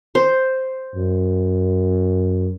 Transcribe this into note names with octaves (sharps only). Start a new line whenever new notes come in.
C5
F#2